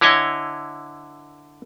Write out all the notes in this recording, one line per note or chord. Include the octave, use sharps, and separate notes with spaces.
D3 E4 C#5 D#5 G#5